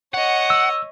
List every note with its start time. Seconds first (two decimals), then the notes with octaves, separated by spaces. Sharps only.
0.14 C#5 D#5 F#5
0.50 E6